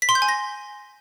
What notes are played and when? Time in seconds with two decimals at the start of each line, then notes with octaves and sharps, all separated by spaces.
0.02 B6
0.09 C6
0.15 G6
0.22 G#5
0.29 A#6